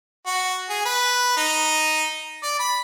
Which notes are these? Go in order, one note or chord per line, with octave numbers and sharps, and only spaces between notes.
F#4
G#4
B4
D#4
D5
B5